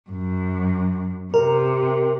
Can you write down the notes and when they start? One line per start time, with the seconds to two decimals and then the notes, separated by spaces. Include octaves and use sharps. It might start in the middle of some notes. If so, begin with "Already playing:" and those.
0.10 F#2
1.34 C3 A#4